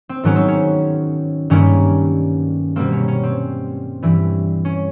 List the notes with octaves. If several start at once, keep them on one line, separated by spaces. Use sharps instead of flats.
C4
G#2 D#3 F#3 B3 C#4
C4
C#4
G2 D#3 G3 A#3 C#4
B2 G3 A#3 C4
C#4
C#4
C4
G2 E3 G3
C#4